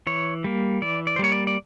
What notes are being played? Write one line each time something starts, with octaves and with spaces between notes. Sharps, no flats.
E3 C#5
G3 A#3
E3 D5
D5
C5
G3 A#3 C#5
D5
D5